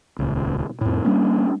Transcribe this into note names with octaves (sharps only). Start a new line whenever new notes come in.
D#1 C#2
F2 A2
G3 A#3 C#4 D4